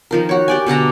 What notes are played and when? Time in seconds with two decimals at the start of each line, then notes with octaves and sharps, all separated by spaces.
0.11 D#3 F3 A#4
0.29 F#4 C#5
0.48 G4 D5 G#5
0.66 B2 D3 A5 A#5